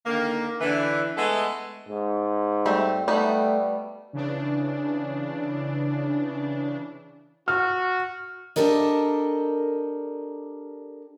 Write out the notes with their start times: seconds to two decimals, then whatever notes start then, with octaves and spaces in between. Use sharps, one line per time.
0.06 D3 D#3 A#3
0.60 D3 E3
1.17 G#3 A3 B3 A4
1.89 G#2
2.66 G3 A3 C4
3.08 G3 A3 B3 D#4
4.13 C#3 E3 D4
7.48 F#4 F6
8.56 D4 G4 A4 A#4 D#5